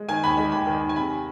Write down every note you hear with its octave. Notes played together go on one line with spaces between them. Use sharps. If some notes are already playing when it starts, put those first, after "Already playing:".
Already playing: G#3
D#3 G#5
D#2 B5
G#3 B5
D#2 B5
D#3
D#2
G#5
C3 B5